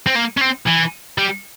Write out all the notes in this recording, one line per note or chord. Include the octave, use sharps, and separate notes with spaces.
C4
A#3
C#4
C4
E3
G3